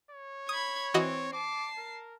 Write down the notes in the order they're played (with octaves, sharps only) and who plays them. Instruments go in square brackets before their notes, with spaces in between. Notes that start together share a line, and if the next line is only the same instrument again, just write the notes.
[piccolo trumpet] C#5
[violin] B5 G#6 [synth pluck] D#6
[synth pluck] E3 F#4 D#5 [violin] C4
[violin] A5 C7 [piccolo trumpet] D6
[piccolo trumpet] A#4